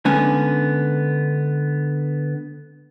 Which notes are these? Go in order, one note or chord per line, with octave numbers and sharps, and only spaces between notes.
D3 G#3 B3 C#4 G#5